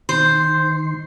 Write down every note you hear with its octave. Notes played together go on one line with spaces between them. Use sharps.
D#3 C5 C6